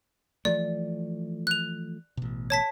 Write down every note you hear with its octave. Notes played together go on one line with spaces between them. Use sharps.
E3 F3 A3 D5
F#6 F7
A1 B2
C#5 A5 B6